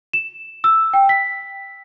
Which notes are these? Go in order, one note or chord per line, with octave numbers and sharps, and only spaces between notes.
E7
E6
G5
B6